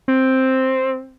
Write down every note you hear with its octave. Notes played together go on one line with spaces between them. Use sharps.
C4